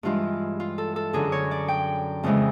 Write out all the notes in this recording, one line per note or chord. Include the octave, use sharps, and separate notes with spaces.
G2 E3 G#3 F4
F4
A4
A4
F#2 D3 F#3 G#4
C#5
D5
G5
F2 C#3 E3 G#3